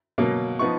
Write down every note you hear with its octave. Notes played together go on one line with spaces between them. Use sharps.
B2 F#3 A#3
F3 B3 D#4 C#6